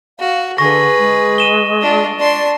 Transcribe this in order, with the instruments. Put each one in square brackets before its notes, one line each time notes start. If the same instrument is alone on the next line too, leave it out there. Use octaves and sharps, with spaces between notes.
[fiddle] F#4 [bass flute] F5
[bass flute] D3 [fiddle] G#4 B4 [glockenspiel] C#6 A#6
[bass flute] G#3
[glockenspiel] D#7 E7 G7
[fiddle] D4 F4
[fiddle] D4 C6 [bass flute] D5